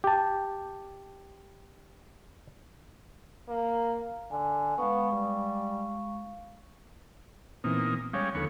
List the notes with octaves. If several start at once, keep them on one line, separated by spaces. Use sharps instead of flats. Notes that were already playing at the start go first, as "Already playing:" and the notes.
G4 A5
A#3
D3 G#5
G#3 B3 F5 C#6
G3
A#2 E3 B3 C4 D#4
G3 G#3 C#4 C#5 F5
D#2 D3 F3 B3 A4 C#5